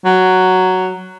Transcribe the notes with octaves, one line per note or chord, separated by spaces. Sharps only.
F#3